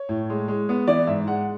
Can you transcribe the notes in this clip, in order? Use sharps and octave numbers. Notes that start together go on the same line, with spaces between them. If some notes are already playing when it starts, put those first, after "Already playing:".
Already playing: C#5
A2
G#3
G#3
B3
E3 D5
G#2 E5
G#3 F#5